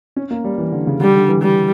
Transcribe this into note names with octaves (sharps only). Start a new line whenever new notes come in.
C#4
A#3
G3
E3
D3
C#3
D3 G3
D3
E3
G3